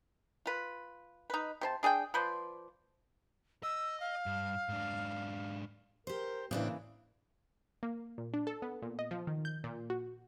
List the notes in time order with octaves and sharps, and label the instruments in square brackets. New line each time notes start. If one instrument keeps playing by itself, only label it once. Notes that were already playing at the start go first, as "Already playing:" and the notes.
[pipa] F4 B4
D#4 B4
C3 C5 A5
D4 G#4 F#5 G5
F3 B4 C5 D5
[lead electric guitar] D#5 [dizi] E6
[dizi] F5
[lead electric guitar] G2
G#2 D4
[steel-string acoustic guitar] G4 C5 [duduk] A#4
[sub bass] A2 [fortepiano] C#3 E3 [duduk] A#3 [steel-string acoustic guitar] C4 D4 E4
[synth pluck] A#3
A#2
D4
A4
B3
A#2
D#5
F3
D#3
G6
A#2
F#4